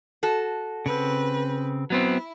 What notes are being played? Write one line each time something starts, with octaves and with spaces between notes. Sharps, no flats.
F#4 A4
C#3 C4 B4
F#3 B3 C4 E4